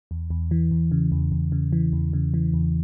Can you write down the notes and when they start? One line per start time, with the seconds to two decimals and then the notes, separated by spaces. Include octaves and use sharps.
0.11 E2
0.30 E2
0.51 E3
0.71 E2
0.92 C#3
1.12 E2
1.32 E2
1.52 C#3
1.73 E3
1.93 E2
2.13 C#3
2.34 E3
2.54 E2